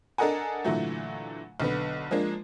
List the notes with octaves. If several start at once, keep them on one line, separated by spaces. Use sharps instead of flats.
D4 A4 A#4 D#5 F#5 G#5
A#2 D3 E3 F#3 A3
B1 D3 B3
F3 G#3 A#3 D4